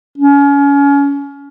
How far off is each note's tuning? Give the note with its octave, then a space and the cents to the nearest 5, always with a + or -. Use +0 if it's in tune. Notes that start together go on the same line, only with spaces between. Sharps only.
C#4 +30